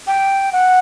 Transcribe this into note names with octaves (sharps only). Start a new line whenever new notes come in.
G5
F#5